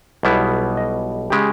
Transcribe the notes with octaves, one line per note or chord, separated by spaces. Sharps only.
B1 B2 G3 B3 E4
D#5
C#3 G#3 G4